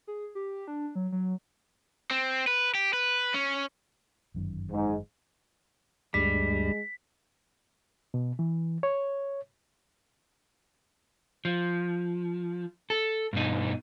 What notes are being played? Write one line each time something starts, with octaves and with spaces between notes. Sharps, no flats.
G#4
G4
D4
F#3
F#3
C4
B4
G4
B4
C#4
G1 F#2 D#3
G#2
D2 G2 G3 G#3 B6
B2
E3
C#5
F3
A4
G2 B2 D#4